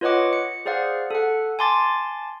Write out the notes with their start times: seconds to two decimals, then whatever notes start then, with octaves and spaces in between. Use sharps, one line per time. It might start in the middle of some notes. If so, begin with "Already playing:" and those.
0.01 F4 B4 C#5 D#5 F#5 D6
0.33 C#7
0.66 G#4 C5 D5 F5 F#5
1.11 A4 F#5
1.59 G#5 A5 C6 D6 A6